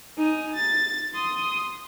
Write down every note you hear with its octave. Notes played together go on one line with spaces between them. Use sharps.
D#4 G#5
A6
C6 D#6